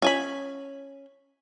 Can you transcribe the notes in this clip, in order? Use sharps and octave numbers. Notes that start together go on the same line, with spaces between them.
C#4 G#5 B5